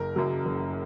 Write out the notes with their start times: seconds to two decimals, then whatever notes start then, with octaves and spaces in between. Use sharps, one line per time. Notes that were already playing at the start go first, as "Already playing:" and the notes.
Already playing: F#1 A#4
0.16 F#2 C#3 F#3
0.45 F#1